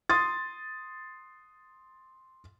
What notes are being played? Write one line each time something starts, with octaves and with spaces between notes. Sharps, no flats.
C6 D#6 A6